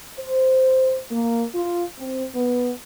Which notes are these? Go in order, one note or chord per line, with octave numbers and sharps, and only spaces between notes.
C5
A#3
F4
C4
B3